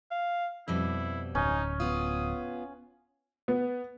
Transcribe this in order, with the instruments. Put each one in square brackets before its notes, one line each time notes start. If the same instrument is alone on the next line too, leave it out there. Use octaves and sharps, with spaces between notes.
[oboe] F5
[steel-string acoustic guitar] F2 B2 G3 [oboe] E4
[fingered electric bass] D1 [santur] C#4 [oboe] D#4
[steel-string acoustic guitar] B3 F4 [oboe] D#6
[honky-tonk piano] B3